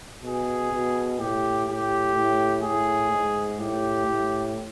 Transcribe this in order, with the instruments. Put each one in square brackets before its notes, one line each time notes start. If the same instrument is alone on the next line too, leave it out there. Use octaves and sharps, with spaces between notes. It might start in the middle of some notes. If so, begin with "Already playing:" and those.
[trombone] B2 [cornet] G#4
[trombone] B2
[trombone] A2 [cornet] G4
[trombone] A2 [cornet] G4
[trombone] A2
[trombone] A2 [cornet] G#4
[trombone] G#2
[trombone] A2 [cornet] G4
[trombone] A2